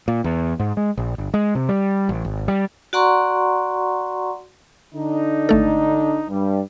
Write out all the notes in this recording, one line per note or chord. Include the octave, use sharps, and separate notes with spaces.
A#2
E2
G#2
G#3
A#1
G1
G#3
C3
G3
A1
G#1
G3
F#4 D5 F#5 A#5 C6 C#6
D3 D4 D#4
G#1 A3 A4
G2 G3